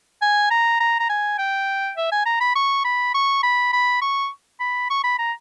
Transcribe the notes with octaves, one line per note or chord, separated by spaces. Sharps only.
G#5
A#5
A#5
A#5
G#5
G5
E5
G#5
A#5
B5
C#6
B5
C#6
B5
B5
C#6
B5
C#6
B5
A#5